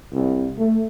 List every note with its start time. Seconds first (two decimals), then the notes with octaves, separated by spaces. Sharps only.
0.12 C2
0.58 A3